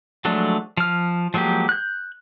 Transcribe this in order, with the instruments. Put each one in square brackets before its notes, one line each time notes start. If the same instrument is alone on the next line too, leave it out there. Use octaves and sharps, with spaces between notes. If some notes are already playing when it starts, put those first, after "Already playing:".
[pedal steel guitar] F3 F#3 G#3 A3 D4
F3 F6
F3 F#3 G#3 A#3 G4
F#6 G6